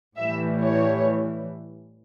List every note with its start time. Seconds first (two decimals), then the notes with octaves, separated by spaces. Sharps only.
0.17 A2 E3 G3 E5
0.62 C#5